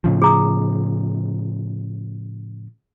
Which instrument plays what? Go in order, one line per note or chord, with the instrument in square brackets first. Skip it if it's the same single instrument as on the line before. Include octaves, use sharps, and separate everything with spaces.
[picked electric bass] A2 C#3 F3
[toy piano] G#4 A#5 D#6